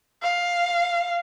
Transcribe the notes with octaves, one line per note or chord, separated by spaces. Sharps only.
F5